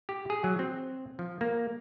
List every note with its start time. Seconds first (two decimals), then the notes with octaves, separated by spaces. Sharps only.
0.09 G4
0.30 G#4
0.44 F#3
0.59 C4
1.19 F3
1.41 A#3